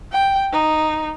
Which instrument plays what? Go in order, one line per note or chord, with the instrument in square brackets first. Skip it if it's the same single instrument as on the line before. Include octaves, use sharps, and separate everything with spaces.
[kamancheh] G5
D#4